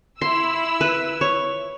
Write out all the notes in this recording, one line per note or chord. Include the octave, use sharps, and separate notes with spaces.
E4 C6 E6
B4
C#5